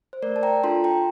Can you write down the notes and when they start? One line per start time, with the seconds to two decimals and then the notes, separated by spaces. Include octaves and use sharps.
0.13 C5
0.22 A3 A#4 D5
0.36 A5
0.43 G5 A#5
0.64 D4 F4 A4 A5 C6
0.84 G5 A#5